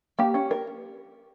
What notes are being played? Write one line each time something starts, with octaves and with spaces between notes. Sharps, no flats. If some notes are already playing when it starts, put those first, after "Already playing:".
A#3 G4
C#4
A#4